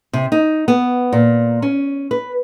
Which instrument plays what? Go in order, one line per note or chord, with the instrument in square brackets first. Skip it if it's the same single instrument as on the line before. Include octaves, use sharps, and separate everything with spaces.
[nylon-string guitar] C3
D#4
B3
A#2
C#4
B4